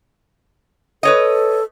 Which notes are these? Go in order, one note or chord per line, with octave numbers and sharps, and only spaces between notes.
A4 B4 C#5 D#5